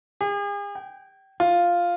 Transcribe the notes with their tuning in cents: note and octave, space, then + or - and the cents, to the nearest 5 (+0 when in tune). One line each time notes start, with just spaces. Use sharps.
G#4 -45
G5 -25
F4 +0